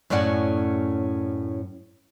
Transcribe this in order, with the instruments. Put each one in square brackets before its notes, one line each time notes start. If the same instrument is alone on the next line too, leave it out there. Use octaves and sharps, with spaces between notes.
[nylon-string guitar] F#2 A2 C#4 D5 F#5